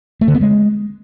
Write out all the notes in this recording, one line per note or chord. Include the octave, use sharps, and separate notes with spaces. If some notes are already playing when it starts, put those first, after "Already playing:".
A3
D3
B3
G#3